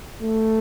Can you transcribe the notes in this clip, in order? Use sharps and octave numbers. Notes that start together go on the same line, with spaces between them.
A3